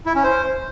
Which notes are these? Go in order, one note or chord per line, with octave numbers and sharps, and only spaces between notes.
E4
C#4
C5